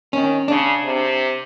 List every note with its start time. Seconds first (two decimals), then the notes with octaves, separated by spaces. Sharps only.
0.13 D#3 C#4
0.48 C#3 D4
0.83 C3